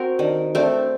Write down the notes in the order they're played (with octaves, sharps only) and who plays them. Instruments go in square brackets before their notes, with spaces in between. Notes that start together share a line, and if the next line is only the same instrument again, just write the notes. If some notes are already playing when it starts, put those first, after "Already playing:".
Already playing: [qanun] C4 F#4 A#4
[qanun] D#3 [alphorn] D4
[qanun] A3 C4 [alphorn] D4